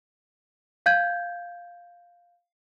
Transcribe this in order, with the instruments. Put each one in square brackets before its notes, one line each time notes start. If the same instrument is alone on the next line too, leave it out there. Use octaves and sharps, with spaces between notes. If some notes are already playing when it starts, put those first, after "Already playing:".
[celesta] F5 G6 G#6